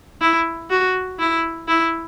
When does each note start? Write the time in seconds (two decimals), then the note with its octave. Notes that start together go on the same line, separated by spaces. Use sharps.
0.21 E4
0.70 F#4
1.19 E4
1.68 E4